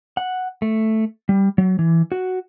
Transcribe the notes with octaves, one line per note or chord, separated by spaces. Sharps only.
F#5
A3
G3
F#3
E3
F#4